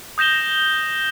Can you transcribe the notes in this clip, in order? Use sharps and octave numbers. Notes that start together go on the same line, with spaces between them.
D#6 G6 A#6 E7 G7